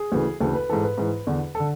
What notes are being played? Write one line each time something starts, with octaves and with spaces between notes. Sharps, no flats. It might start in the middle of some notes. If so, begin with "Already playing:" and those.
Already playing: G#4
D2 C#3 E3
D2 C#3 E3 A4
B4
G#2 E3 A4
B4
G#2 E3
E2 D3
A4
D3